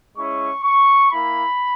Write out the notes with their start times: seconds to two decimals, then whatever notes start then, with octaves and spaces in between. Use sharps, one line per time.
0.15 G#3 C#4 E4 C#6
0.63 C#6
1.11 A#3 E4 B5